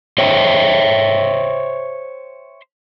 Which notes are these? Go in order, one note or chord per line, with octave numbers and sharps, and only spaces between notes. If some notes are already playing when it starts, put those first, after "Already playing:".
C5 C#5 E5 G5